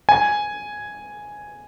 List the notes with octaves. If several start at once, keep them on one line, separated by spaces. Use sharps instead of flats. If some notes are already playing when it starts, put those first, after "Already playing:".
G#5